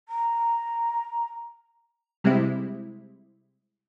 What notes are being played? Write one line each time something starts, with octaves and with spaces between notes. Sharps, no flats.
A#5
C3 G3 G#3 C4 E4